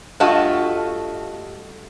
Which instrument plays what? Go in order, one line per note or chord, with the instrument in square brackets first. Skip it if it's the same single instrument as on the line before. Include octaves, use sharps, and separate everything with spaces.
[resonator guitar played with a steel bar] G2 A3 F4 F#4 D#5 A5